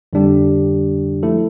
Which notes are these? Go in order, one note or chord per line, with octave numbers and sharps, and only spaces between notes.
F2 D3 G3 D4 G4
F3 A3 E4 A4